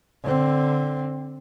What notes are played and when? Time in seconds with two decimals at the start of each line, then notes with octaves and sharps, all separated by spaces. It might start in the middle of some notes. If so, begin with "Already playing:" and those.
0.24 D3 C4